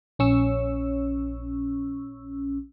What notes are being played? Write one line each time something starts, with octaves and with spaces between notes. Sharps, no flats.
A#1 C#4 C#6 E6